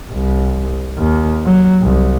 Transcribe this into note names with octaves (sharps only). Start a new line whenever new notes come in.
C2
D#2
F#3
C2